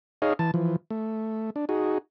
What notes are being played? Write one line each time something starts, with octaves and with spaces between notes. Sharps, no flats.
D#4 G#4 C#5 D#5 F5
E3 A5
E3 F3
A3
D4
D#4 F#4 G#4